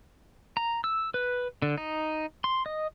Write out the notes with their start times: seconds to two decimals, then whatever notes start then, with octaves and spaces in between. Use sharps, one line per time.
0.57 A#5
0.84 E6
1.14 B4
1.62 D3
1.78 D#4
2.44 C6
2.66 D#5